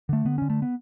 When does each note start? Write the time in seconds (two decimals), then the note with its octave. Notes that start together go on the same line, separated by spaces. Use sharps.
0.09 D3 A3
0.25 D3 B3
0.38 D3 C#4
0.50 A3
0.62 B3